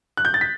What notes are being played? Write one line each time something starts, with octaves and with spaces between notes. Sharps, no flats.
F#6
G6
A6
B6